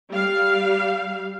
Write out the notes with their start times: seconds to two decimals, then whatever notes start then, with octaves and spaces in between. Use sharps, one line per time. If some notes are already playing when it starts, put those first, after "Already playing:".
0.10 G3 F5